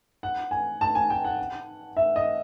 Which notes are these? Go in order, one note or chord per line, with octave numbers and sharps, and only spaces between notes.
F#5
G#5
A5
G#5
G5
F#5
E5
D#5